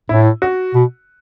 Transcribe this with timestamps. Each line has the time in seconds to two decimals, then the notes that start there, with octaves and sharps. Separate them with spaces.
0.09 A2 E4
0.42 F#4
0.75 B2